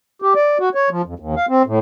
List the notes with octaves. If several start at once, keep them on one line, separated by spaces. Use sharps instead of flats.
G4
D5
F#4
C#5
F3
F2
D#2
F5
C4
A2